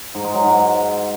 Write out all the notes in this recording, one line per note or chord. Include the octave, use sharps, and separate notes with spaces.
G#2
G#3
F#3
G#2